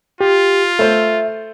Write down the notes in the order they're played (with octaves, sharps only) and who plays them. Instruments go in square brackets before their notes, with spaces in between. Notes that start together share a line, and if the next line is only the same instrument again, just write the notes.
[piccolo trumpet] F4 [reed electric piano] G4
[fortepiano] A3 C5 [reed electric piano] E5